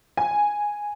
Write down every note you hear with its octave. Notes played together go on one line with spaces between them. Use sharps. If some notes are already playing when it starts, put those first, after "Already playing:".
G#5